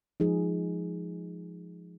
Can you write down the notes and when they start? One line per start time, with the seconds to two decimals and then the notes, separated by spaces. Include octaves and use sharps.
0.20 F3 G#3 D#4 G#4